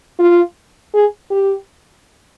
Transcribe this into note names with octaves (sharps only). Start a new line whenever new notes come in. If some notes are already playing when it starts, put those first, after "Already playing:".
F4
G#4
G4